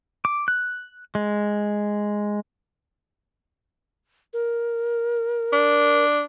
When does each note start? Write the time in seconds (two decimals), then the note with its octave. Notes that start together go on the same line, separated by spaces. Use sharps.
0.25 D6
0.48 F#6
1.15 G#3
4.33 A#4
5.53 D4